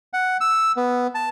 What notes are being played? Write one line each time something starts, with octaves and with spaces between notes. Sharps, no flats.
F#5
E6
B3
A5